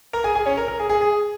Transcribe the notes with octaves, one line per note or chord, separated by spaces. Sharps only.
A#4 A#5
G#4 G#5
G#4 G#5
C#4 C#5
A#4
A#4
G#4
G#4
G#4